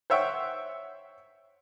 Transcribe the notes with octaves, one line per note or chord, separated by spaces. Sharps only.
C5 C#5 E5 F#5 G5 C#6